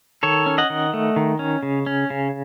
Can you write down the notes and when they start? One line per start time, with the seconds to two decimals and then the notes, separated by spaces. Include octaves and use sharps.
0.23 D#3 A4 C#5
0.46 C#4
0.58 D#5 F#5
0.70 D#3
0.94 A3
1.16 D#3
1.39 C#4
1.63 C#3
1.86 C#4
2.10 C#3